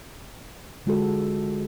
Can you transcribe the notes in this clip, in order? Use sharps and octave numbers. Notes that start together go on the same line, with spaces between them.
D3 G#3 F4 F#4 A4